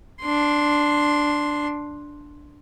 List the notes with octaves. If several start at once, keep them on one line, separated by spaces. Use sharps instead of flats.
D4 C6